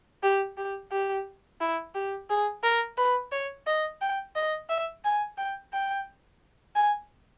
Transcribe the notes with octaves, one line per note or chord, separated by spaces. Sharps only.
G4
G4
G4
E4
G4
G#4
A#4
B4
C#5
D#5
G5
D#5
E5
G#5
G5
G5
G#5